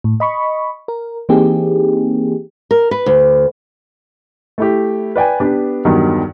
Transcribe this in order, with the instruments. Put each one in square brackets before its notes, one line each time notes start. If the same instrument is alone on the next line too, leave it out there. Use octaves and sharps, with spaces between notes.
[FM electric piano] A2
D#5 B5 C#6
A#4
E3 A#3 C4 D#4 G4 G#4
[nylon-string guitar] A#4
B4
D2
[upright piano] A3 E4 G4
B4 D5 G5 G#5
B3 D4 G4 B4
E2 G2 D#3 F#3